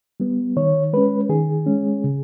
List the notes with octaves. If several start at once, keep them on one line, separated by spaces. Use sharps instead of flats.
G3 B3
D#3 C#5
G#3 C#4 B4
D#3 G#4
G#3 C#4
C#3